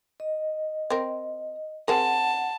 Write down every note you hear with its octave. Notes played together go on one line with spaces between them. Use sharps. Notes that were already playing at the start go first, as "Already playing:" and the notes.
D#5
C4 A#4
C4 G#4 A#4 F#5 A5